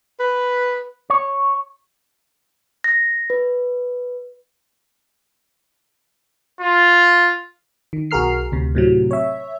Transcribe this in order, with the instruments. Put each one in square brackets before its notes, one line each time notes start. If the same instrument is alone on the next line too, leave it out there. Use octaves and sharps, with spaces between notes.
[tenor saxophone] B4
[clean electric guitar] C#5
[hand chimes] A#6
B4
[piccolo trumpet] F4
[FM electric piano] D#3
B1 F#4 G#4 A#4 F6 C7
D2 C3
A2 C3 F#3
C#5 E5